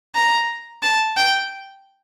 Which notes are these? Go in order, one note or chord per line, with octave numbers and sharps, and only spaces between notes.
A#5
A5
G5